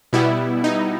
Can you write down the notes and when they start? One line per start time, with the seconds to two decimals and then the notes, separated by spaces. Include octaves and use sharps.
0.13 B2 G3 B3 E4
0.64 D#4